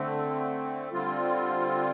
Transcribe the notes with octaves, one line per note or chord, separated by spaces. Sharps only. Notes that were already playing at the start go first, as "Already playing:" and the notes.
Already playing: D3 A3 C4
D3 G3 C4 F4